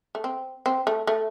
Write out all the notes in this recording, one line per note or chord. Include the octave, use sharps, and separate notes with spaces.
A3
C4
C4
A3
A3